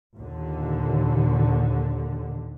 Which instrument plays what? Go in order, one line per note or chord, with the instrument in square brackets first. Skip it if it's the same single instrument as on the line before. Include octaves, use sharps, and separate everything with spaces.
[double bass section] D#2 A#2 D3